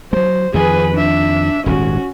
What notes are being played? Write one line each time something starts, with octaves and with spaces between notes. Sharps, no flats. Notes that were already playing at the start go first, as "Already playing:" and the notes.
F#3 G#3 C5
F2 D#3 F3 G#4 B4
D4 E5
D#1 G#1 G#3 C#4 F#4